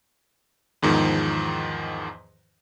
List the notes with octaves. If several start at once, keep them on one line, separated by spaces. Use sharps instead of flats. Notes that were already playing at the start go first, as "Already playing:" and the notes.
E2 G#2 D#3 F3